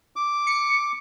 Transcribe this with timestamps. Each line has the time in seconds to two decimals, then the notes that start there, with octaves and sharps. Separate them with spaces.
0.16 D6
0.47 C#7